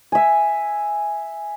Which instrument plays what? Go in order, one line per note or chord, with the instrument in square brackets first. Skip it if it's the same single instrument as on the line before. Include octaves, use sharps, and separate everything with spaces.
[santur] E5 G#5